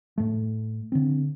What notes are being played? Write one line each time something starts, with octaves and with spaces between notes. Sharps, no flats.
A2 A3
D3 C4